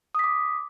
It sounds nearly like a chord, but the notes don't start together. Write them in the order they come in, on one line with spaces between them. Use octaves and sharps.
D#6 B6 D6